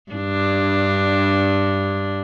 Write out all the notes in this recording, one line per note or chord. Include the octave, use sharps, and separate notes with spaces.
G2 D4